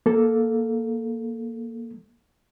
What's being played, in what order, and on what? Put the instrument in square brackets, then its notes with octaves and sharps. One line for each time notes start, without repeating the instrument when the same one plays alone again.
[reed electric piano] A#3 A4